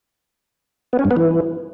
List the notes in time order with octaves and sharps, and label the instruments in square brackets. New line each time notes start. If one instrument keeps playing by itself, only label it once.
[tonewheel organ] B3
C#4
G2
B3
E3